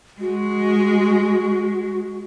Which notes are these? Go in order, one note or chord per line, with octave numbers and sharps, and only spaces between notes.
G#3 F#4